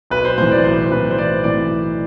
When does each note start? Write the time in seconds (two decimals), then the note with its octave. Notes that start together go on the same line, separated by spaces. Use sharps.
0.10 B1 B4
0.25 C5
0.38 A2 E3 C5
0.52 D5
0.64 B1 C5
0.91 A2 E3 B4
1.11 C5
1.17 B1 D5
1.44 A2 E3 D5